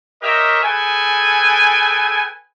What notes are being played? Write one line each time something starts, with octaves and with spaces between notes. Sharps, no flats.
G4 A#4 C#5 D#5 E5 A#5
G#4 A4 B4 G5 G#5